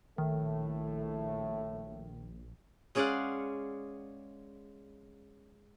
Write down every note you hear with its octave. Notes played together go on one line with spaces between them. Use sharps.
A#1 A2 D#3 A3
G#3 C#4 G#4 D5 F5 F#5